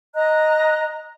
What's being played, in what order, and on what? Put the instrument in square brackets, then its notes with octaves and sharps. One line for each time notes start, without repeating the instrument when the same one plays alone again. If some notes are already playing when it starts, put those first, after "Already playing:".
[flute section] D#5 A#5 F#6